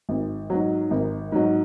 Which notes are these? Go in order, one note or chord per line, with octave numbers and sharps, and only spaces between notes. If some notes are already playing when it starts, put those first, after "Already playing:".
G#1
G#2 F#3
G#1
G#2 F#3